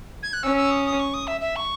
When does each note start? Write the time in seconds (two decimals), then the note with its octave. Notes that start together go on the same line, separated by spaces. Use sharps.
0.23 G#6
0.33 F#6
0.43 C#4 E6
0.57 E6
0.71 D#6
0.86 D#6
0.99 C#6
1.14 D#6
1.27 E5
1.41 E5
1.56 C#6